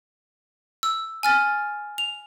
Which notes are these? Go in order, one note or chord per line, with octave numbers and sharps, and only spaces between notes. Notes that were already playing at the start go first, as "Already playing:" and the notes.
E6
G#5 F6 A6
F7